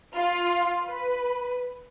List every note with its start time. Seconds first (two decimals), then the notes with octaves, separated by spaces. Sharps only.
0.15 F4
0.86 B4